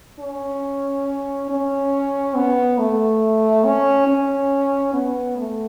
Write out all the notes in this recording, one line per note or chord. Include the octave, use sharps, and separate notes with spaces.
C#4
C#4
B3
A3
C#4
C#4
B3
A3